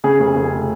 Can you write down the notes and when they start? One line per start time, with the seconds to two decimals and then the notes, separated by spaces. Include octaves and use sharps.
0.04 C#3 G#4
0.19 F1
0.36 F1